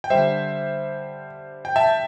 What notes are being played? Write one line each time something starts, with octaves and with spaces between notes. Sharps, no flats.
G5
D3 G3 C5 E5
G5
E5 A5